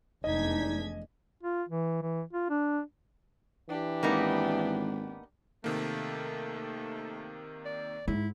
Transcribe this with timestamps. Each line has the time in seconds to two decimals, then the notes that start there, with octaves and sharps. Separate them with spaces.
0.24 F1 E2 G#3 D4 D#4 D#5 G#6 B6
1.43 F4
1.69 E3
2.02 E3
2.33 F4
2.50 D4
3.69 E3 D4 G4
4.03 G#1 A#3 B3 D#4
5.64 C3 D#3 A3 A#3
7.65 D5
8.08 G#2 E4